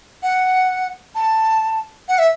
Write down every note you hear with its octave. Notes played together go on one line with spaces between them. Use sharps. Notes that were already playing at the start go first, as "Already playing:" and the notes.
F#5
A5
F#5
E5